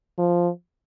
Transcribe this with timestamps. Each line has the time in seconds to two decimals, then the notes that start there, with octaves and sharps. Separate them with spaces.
0.18 F3